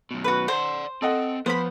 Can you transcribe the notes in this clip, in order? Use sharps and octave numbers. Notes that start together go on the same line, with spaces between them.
F#2 B2
F#4 B4
C5 D5 F#5
C4 A4 D#5 F#5
F3 B3 C5 B5